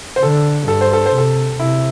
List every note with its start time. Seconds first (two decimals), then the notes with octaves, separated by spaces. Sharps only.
0.16 C5
0.22 D3 A4
0.68 G2 A4
0.81 C5
0.93 A4
1.06 C5
1.14 C3 A4
1.60 C3 E4